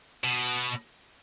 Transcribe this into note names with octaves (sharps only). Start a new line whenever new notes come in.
B2